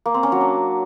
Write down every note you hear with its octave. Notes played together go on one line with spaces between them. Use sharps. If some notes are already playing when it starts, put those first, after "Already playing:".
A#3
C4
C#4
F#3
D4